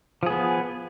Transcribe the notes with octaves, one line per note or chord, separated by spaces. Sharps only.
F3 B3 G#4